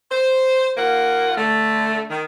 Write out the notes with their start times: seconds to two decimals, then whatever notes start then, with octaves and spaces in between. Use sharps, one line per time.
0.11 C5
0.77 D#2 A#3 F4 F#5
1.37 D3 A3
2.10 D#3